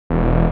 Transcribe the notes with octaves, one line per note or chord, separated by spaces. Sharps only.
E1